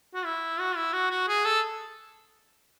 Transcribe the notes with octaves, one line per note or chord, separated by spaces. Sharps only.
F#4
E4
F#4
E4
F#4
F#4
G#4
A4